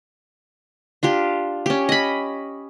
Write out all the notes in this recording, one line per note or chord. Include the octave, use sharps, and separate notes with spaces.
D4 F4 G4
C#4 G4
D#5 B5